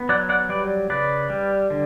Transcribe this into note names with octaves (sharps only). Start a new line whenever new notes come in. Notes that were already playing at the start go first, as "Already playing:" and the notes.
Already playing: B3
F#3 D5 F#5
D5 F#5
G3 B4 D5
C#3 B4 D5
G3
D3